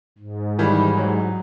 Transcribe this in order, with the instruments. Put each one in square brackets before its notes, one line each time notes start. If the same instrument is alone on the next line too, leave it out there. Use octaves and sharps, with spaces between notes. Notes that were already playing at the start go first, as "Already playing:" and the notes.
[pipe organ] G#2
[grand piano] D#3 E3 G3
F#3